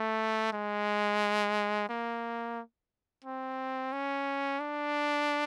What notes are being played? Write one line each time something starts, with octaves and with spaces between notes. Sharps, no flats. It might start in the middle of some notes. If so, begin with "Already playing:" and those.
Already playing: A3
G#3
A#3
C4
C#4
D4